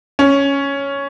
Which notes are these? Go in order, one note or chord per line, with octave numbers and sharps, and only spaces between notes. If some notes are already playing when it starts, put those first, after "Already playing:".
C#4